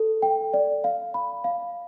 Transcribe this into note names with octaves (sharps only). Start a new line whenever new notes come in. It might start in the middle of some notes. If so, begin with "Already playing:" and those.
Already playing: A4
G5
D5
F5
B5
F5